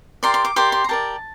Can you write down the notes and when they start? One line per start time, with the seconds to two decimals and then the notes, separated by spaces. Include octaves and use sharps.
0.23 G4 A#4 D5 C6
0.34 C6
0.45 D6
0.56 G4 A#4 D5 C6
0.72 C6
0.84 A#5
0.89 G4 A#4 D5 A5